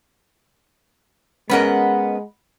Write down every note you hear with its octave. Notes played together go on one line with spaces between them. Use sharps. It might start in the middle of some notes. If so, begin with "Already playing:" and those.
G#3 B3 C#4 A#4 D#5 F#5 B5